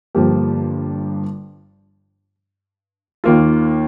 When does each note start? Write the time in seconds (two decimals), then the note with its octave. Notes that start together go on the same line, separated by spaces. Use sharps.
0.15 G1 G2 F3 A#3 G4
3.24 D#2 D#3 A#3 F4